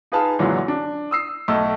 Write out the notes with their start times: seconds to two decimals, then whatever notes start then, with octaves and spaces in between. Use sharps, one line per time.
0.12 D#4 F4 G#4 B4 F5 A5
0.39 F#2 A#2 D3 E3 F#3 G#3
0.68 D4
1.11 D#6 E6 C7
1.48 B1 A3 A4 E6